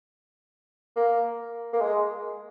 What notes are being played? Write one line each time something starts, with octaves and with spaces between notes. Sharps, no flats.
A#3
A#3
G#3